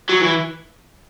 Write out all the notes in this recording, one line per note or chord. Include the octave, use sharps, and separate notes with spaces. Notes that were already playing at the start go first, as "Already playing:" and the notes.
F#3
E3